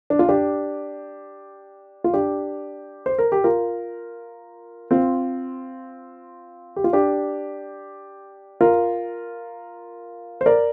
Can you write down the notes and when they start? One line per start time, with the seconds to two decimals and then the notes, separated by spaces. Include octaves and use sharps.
0.10 D4
0.19 F4
0.29 D4 G4
2.04 F4
2.13 D4 G4
3.06 C5
3.18 A#4
3.32 G4
3.44 F4 A#4
4.91 C4 F4
6.76 G4
6.84 F4
6.93 D4 G4
8.61 F4 A#4
10.41 C5
10.46 A#4 D5